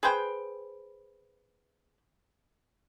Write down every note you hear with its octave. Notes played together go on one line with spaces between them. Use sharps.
G#4 B4 C5 G5